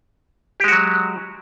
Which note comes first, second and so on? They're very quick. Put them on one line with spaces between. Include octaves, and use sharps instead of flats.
G4 G#3 F#4 F#3